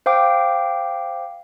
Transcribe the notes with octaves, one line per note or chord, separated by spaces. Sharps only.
C5 F5 G5 D6